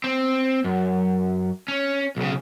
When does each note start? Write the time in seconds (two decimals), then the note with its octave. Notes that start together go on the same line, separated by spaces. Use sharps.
0.04 C4
0.64 F#2
1.68 C#4
2.17 B1 C#3